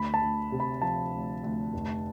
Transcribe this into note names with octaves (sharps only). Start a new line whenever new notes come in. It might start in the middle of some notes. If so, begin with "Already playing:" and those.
Already playing: D2 B5
A5
D2
C3
B5
F3 A5
D2
D2
F1